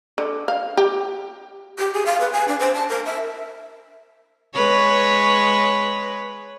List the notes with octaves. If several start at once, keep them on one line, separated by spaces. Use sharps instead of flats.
D3
F5
G4
G4
G#4
F5
B4
G#5
D4
C5
A5
A#4
E5
G#3 B4 C#5